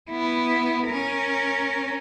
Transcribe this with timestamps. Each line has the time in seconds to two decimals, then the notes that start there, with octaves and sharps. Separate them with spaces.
0.10 B3 E4
0.88 C#4 A#4